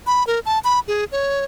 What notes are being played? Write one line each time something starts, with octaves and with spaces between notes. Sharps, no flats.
B5
A#4
A5
B5
G#4
C#5